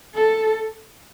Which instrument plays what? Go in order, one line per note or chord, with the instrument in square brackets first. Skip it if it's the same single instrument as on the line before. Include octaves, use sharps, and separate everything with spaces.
[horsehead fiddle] A4